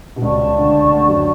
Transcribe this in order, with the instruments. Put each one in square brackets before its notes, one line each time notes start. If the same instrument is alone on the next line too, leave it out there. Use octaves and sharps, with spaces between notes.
[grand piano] B2
[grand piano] C#2 C#3 [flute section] G4 D5 A5 C#6
[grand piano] D2 D3
D2 D3
F#2 F#3